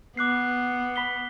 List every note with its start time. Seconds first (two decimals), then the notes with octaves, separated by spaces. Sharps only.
0.17 B3 D6 F#6 C7
0.96 B5 B6 G7